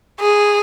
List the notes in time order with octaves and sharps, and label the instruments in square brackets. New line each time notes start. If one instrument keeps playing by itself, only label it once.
[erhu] G#4